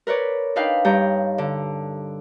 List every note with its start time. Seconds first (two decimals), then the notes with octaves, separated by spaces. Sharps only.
0.07 A#4 B4 C#5 D5
0.56 D4 D#4 B4 F5 G5
0.85 G2 G3 C#5 A#5 G6
1.38 D3